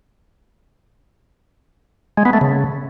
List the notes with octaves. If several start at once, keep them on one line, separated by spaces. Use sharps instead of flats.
G#3
B3
A3
C#3